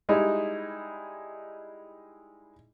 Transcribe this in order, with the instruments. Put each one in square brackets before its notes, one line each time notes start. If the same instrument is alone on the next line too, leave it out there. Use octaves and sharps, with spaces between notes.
[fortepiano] G3 G#3 D#4 E4